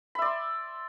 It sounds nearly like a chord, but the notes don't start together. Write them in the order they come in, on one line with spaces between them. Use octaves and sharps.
B5 E5 D5 C6